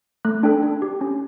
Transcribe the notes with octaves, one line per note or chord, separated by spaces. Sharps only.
A3 F#6
D4 A4 G5
D4
G4
C#4